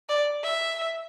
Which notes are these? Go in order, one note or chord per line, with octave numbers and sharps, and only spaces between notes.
D5
E5